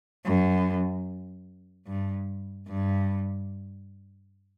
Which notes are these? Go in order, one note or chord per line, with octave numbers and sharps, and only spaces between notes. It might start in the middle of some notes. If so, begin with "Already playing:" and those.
F#2
G2
G2